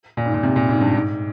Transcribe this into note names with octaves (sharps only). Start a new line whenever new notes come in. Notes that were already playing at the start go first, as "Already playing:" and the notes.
A#2
G#2
A#2
C3
A#2
G#2
G2
G#2